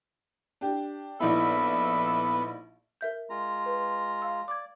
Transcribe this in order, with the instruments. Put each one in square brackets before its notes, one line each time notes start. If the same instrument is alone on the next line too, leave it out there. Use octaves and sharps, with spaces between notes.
[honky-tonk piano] D4 G4
[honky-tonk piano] A#1 D#4 E4 [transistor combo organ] B3 [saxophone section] A4 D5 E5
[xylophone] A#4 E5 G6
[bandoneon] G#3 F4 A#5
[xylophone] B4
F5 E6
[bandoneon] D5 [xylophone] D6 G#6